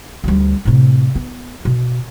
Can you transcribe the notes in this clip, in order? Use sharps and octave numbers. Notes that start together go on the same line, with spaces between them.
D2 G3
A2 C3
B3
B2